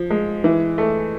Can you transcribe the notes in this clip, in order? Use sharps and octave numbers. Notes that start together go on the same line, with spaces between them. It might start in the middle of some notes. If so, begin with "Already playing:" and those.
Already playing: F3
G#3
E3
A3